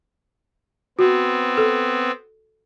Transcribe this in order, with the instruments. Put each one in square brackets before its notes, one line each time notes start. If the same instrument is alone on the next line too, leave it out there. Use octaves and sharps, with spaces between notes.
[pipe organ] B3 C4 [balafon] F#4
[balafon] A4